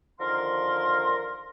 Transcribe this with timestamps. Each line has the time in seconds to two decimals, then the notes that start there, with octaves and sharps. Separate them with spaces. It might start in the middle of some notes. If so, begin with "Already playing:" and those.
0.20 D3 D#3 F3 A#4 F5 C6